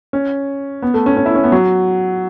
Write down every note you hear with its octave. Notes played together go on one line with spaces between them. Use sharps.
C#4
B3
A3
C#4
C#4
E4
C#4
B3
F#3